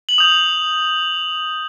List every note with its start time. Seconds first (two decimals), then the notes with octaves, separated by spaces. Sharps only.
0.09 F#7
0.18 D#6 G6 F7